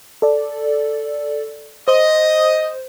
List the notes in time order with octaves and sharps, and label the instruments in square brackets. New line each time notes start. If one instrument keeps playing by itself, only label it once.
[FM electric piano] A4 D5
[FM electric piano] C5 [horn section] D#5